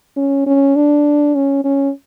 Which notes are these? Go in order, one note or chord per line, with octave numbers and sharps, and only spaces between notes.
C#4
C#4
D4
C#4
C#4